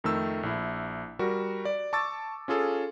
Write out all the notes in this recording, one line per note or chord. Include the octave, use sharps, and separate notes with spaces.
F2 D#3 A3 E6
A#1 E4
G3 F#4 A#4
D5
A5 C#6 D6 E6 A6
C#4 F4 G#4 A4